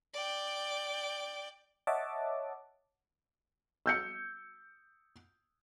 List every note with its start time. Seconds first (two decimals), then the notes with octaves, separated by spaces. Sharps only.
0.14 D5 G5
1.87 C#5 D#5 E5 F#5 A5 D6
3.86 E6 G6 C#7